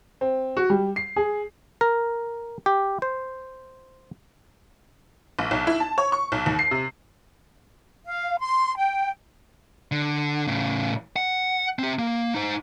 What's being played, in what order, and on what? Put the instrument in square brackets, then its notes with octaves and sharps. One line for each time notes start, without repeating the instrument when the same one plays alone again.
[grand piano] C4
F#4
G3
C7
G#4
[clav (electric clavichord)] A#4
G4
C5
[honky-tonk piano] A#1
B1
E4
A5
C#5
C#6
B1
D#2
C7
C3
[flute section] F5
C6
G5
[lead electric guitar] D3
A2 C#3
F#5
C4 G4
A#3
D#4 C5